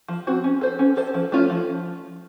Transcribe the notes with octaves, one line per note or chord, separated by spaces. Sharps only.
F3
C4 F#4 C5
C#4
A4 C5
C#4
A4 C5
F3
A3 C#4 F4
F3